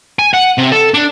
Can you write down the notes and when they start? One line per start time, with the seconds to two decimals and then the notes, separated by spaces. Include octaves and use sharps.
0.19 G#5
0.34 F#5
0.58 C3
0.72 A4
0.94 D4